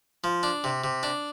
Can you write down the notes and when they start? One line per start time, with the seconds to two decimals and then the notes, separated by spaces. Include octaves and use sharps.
0.24 F3
0.43 D4
0.64 C3
0.84 C3
1.03 D4